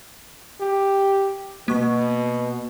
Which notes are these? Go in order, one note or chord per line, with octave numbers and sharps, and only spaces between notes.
G4
B2 A#3 C#6